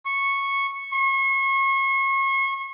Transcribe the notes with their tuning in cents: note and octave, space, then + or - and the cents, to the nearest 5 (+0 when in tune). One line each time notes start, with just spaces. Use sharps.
C#6 -10
C#6 -35